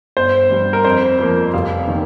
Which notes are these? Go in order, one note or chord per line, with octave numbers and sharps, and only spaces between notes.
G1 C5
G2 G3
A#4
F2 C5
F3 A#3
F1 F5
D#3 A#3